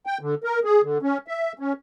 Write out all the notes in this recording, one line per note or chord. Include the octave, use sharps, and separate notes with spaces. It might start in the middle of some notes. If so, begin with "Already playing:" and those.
G5
D3
A#4
G#4
D3
C#4
E5
C#4